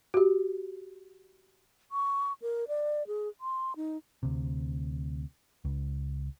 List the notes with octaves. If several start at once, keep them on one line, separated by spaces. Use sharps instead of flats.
F#4 G4
C#6
A#4
D5
G#4
C6
D#4
D2 C3
C#2